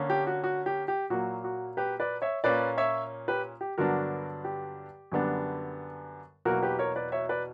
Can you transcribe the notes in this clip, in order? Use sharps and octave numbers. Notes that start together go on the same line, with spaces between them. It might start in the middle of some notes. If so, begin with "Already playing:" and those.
Already playing: D3 A#3 C#4
G4
F#4
F#4
G4
G4
A#2 F#3 A#3 F#4
F#4
G4 B4
B4 D5
C#5 E5
A#2 A#3 C#4 B4 D5
C#5 E5
G4 B4
G4
G2 D3 F#3 B3 D4 F#4 A#4
G4
F#2 D3 G3 B3 D4
E2 B2 F#3 A#3 F#4 A#4
G4 B4
A#4 C#5
B4 D5
C#5 E5
B4 D5